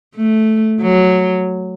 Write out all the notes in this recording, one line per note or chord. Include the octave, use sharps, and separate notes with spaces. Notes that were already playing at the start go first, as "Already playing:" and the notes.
A3
F#3